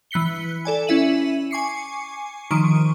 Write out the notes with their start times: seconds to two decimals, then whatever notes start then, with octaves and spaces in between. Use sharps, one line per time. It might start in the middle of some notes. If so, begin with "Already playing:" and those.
0.11 E3 F#6 B6 C#7 G7
0.65 A4 D5 G#5
0.87 C#4 E4 E5 D#7 F#7
1.51 G#5 C#6 D6 C7 C#7
2.51 D#3 F3 C#6 D7 D#7